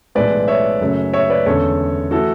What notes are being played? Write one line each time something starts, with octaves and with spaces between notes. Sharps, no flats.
B1 A2 E3 G#3 B4 D5
C#5 E5
F#2 C#3 F#3 A3
C#5 E5
B4 D5
E2 D3 G#3 C#4 A4 C#5
E3 A3 E4 F#4 A4